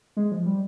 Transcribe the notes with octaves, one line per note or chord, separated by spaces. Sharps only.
G#3
F3
G3